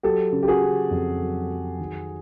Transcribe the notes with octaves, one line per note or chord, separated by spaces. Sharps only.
F#3 G4 A4
C#3
G4
F#4 G#4
C#3
F2
F#3
F#3
D#3